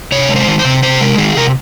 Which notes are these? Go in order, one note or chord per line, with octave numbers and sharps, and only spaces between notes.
C3 C#5
G#3
C5
D#3
C5
C3
C3 C5
G#3 A#4
D#3 G#4
C3 A#4